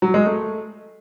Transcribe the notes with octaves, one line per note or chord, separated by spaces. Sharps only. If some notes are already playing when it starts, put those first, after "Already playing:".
F#3
G#3
A3